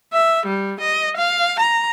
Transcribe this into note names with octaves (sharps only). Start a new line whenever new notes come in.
E5
G3
D#5
F5
A#5